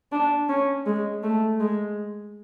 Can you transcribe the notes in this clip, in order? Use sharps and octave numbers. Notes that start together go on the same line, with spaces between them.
D4
C#4
G#3
A3
G#3